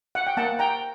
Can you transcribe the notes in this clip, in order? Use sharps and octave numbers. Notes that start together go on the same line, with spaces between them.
F#5
G5
A#3 F#5 A5
G5 A#5